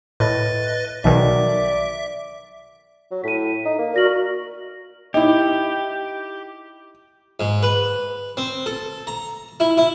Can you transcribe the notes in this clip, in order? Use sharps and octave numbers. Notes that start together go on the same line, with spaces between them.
A2 B4 D#5 A6
B1 B2 D#3 D5 E5
F#3
A2 B6 D#7
D#4
A#3
F#4 A#4 D5 A#6 F#7
D#4 E4 G4
G#2
B4
C4
A4
A#5
E4
E4